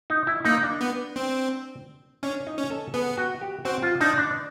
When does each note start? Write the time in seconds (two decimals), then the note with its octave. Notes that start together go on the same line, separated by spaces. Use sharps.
0.10 D#4
0.27 E4
0.45 A#3 D#4
0.63 D4
0.81 B3
1.16 C4
2.23 C#4 D4
2.47 D#4
2.58 C#4
2.70 A4
2.94 B3 G#4
3.17 F#4
3.41 G4
3.65 C4 F#4
3.82 F4
4.01 D4 D#4
4.18 D4